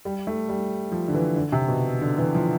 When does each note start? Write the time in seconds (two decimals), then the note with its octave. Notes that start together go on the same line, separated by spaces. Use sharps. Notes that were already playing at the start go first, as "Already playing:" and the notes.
0.05 G3
0.27 A3
0.49 G3
0.92 F3
1.08 D3
1.14 E3
1.36 D3
1.52 C3
1.68 B2
2.01 D3
2.18 E3
2.34 F3